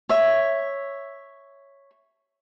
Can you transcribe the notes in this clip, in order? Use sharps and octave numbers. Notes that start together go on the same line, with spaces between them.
C#5 E5